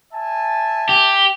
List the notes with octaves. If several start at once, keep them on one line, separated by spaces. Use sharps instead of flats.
E5 G#5 A5
G4